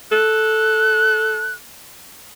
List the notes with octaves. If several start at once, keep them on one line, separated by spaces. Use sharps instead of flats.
A4 F#6